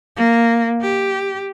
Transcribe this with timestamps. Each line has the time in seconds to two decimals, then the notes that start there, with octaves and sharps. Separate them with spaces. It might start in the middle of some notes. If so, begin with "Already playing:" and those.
0.16 A#3
0.81 G4